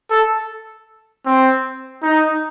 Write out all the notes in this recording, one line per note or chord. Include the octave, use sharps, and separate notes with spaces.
A4
C4
D#4